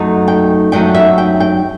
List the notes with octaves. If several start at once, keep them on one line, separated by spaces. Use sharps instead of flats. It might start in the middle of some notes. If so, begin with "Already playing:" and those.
Already playing: F#2 F#3 A3 D#4
G5
F#2 F#3 A3 D#4 G5
E5
G5
G5